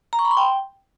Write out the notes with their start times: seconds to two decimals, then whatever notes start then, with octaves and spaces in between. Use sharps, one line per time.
0.13 A#5
0.19 C#6
0.25 B5
0.31 C6
0.37 G5